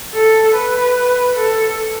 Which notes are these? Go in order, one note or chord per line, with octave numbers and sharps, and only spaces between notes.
A4
B4
A4